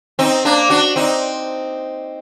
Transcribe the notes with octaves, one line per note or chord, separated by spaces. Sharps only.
C4 D#4
A#3 D4
D4 F#4
C4 D#4